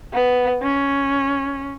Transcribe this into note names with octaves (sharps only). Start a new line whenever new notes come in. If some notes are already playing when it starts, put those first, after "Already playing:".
B3
C#4